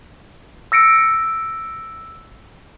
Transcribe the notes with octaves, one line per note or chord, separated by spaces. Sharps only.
E6 A#6 C#7 D7